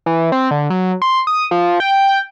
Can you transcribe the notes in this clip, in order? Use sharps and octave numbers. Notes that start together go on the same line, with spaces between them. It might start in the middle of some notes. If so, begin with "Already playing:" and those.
E3
C4
D3
F#3
C6
D#6
F3
G5